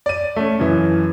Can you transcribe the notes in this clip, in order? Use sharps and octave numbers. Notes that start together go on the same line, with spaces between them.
D5 D#7
A3 C#4
F#2 C#3 E3